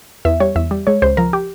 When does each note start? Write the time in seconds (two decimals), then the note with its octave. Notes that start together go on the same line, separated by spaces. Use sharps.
0.25 E2 E5
0.40 G3 C#5
0.56 E2 E5
0.71 G3
0.87 G#3 C#5
1.02 C#2 C5
1.17 F3 A#4
1.33 G4